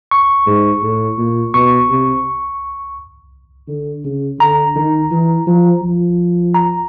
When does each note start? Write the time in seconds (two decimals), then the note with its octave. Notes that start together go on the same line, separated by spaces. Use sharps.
0.11 C#6
0.47 G#2
0.83 A2
1.18 A#2
1.54 B2 C#6
1.90 C3
3.68 D3
4.04 C#3
4.39 D3 A#5
4.76 D#3
5.11 E3
5.47 F3
5.82 F3
6.54 A#5